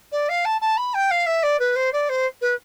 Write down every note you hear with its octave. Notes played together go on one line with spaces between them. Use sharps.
D5
F5
A5
A5
B5
G5
F5
E5
D5
B4
C5
D5
C5
B4